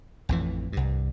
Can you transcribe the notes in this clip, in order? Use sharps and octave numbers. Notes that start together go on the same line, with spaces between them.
A1 F2 E3
C2 G2